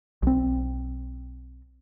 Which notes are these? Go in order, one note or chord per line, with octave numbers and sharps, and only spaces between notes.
B1 C4